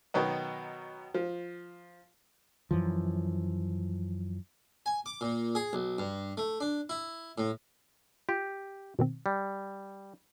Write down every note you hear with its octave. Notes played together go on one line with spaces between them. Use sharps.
B2 D#3 F#3 B3
F3
F#2 E3 F3
G#5
D6
A#2
G#4
B1
G2
A3
D4
E4
A2
F4 G4
B2 D#3 C4
G3